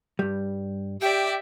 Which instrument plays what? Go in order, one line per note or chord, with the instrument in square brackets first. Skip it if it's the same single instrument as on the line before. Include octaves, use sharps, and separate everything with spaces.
[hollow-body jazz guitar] G2 G3
[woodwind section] G4 [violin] D5 E5 [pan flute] G5